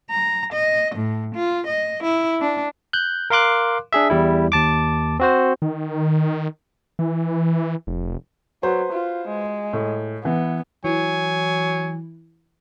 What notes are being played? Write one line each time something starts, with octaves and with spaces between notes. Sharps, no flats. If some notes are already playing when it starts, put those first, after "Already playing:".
A#5
D#5
A2
F4
D#5
E4
D4
F#6 G6
A#4 F5 C6 D6 F#6
D4 G#4 E5
E2 G3 E4
D#2 A5 D6
C4 F#4 C5
D#3
E3
F1
F#3 B4 C5
F4
G#3
A2
E3 B3
E3 F#3 E4 G#5